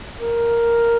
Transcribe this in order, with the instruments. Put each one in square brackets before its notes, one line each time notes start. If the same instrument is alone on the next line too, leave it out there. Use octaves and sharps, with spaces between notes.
[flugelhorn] A#4